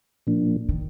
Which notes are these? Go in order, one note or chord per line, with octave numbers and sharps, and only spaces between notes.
A#2 F3 A#3 D4
D#3